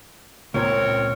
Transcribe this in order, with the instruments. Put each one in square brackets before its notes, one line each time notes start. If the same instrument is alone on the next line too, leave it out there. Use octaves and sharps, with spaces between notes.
[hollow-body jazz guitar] C#2 A#2 [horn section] C4 A#4 C#5